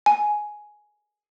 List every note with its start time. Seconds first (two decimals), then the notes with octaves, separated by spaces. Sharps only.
0.06 G#5